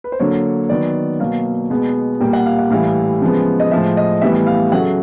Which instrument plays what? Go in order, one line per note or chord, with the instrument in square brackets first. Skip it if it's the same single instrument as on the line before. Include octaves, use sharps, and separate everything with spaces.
[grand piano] B4
C5
D3 F#3 A#3 C#5
D#3 F#3 B3 D5
B2 F#3 A#3 F5
B2 G#3 B3
A#2 G3 A#3 G5
F#5
F5
F#5
A2 E3 G3 F5
C#3 F3 G#3 B3
D#5
A2 F3 G#3 E5
D#5
A2 E3 G3 B3 E5
F5
C#3 F#3 A3 F#5